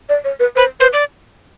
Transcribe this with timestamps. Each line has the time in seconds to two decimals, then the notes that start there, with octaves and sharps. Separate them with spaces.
0.09 D5
0.24 C#5
0.40 B4
0.56 B4 C5
0.80 B4 C5
0.93 D5